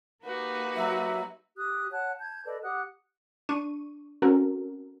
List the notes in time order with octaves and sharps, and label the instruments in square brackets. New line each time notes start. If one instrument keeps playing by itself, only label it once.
[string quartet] A#3 D#4 F#4 [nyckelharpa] G4 B4
[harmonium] F#3 [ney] E5
[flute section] G4 D#6 F#6
C#5 F#5 A5 F#6
A5 G6 G#6
A4 B4 D5 D#5
G4 F#5 D#6 F#6
[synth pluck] D4 C#6 D#7
C4 C#4 F#4 A4 A#4